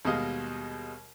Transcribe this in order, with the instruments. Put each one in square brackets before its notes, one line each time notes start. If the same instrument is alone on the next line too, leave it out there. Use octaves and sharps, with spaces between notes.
[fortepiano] D#2 B2 G3 G#3 D#5 F5